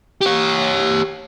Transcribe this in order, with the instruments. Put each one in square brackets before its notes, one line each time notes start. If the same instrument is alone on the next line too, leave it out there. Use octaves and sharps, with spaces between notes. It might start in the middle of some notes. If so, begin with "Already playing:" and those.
[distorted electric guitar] G4 C#5